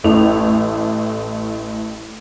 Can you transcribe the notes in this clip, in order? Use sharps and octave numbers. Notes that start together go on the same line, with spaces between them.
A1 A2 A3 F7